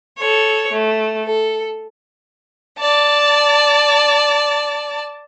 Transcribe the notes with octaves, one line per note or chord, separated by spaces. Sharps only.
A4 C#5
A3
A4
D5 A5